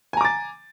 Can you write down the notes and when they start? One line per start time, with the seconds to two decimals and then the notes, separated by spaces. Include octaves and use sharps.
0.13 G#5
0.17 A#5
0.21 D6
0.25 A6